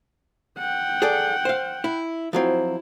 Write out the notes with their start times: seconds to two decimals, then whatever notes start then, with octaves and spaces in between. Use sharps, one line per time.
0.58 F#5 G5
1.02 G#4 A4 D5
1.45 C5 F5
1.84 E4
2.33 F3 F#3 C4 E4